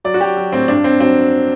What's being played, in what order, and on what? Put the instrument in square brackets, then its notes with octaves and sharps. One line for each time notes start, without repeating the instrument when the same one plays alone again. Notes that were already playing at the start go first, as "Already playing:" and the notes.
[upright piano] F#3 D5
F#4
F#3 G4
F#3
A2 C4
G2 D4
G2 C4
F#3 C4